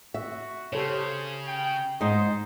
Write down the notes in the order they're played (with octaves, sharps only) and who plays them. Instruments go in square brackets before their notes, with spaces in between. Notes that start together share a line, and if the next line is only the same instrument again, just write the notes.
[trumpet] F#4 [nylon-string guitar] E5
[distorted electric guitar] C#3 [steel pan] G4 A4 C#5 [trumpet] C5
[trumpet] G5
[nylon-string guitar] G#2 D#4 [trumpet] C5 [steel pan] D#5